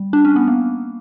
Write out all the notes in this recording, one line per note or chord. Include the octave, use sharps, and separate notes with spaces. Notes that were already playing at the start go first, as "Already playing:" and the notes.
Already playing: G3
D4
C#4
B3
A#3